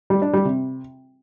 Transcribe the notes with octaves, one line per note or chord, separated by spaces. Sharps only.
G3
D4
G3
C3